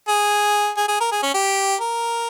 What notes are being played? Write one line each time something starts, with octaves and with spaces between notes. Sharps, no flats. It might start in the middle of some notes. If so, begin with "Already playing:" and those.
G#4
G#4
G#4
A#4
G#4
C#4
G4
A#4